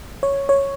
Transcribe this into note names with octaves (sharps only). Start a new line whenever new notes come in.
C#5
C#5